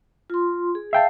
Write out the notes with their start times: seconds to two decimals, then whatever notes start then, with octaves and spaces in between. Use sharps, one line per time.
0.30 F4 C6
0.75 G#4
0.93 E5 F5 G5 A5